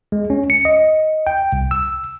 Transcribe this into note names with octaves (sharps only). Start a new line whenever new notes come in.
G#3
C#4
C#7
D#5
G5
C2
E6